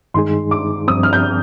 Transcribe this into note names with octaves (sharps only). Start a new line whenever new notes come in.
G2 D#3 G#3 D#4 G#4 C6
D6
G2 F3 C4 D#6
F6
G6